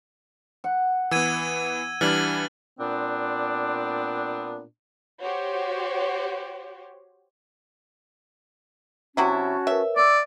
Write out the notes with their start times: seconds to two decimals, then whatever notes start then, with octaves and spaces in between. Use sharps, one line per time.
0.64 F#5
1.11 E3 B3 E6 G#6 D#7
2.01 E3 G3 D4 F6 A6 F#7
2.79 A#2 B3 C4 D4
5.21 F#4 G4 C5 C#5
9.17 C3 F#3 C#4 E4 F#4 A5
9.67 A#4 B4 C#5 E5
9.96 D5 D6 E6